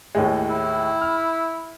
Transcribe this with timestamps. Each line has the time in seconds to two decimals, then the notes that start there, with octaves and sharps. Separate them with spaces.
0.15 D#2 A2 G#3
0.50 E4
1.01 F6